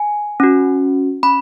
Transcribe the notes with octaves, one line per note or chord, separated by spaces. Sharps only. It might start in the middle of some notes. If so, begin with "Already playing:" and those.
Already playing: G#5
C#4 F#4
C#4 B5